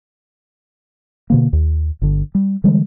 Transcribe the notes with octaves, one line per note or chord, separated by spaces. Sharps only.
B2 D3 A#3
D#2
G1 D3
G3
D3 E3 G3 G#3